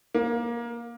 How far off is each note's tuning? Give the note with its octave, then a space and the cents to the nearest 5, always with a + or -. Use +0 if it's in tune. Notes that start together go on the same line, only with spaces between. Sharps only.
A#3 +20